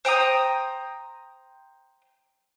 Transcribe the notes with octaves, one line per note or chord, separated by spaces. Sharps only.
C5 G5 A#5 D#6